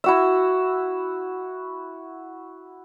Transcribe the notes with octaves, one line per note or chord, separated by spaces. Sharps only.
E4 F#4 E5